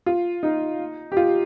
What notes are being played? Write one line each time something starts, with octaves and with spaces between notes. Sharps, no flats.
F4
D#4
G4
F4